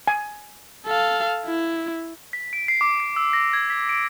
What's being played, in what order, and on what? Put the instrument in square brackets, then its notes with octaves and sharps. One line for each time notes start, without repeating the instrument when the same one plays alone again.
[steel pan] G#5
[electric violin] A4 F5
E4
[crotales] B6
D7
C7
D6
C7
E6
A#6
G#6
B6
D7